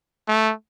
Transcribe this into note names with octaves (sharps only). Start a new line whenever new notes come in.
A3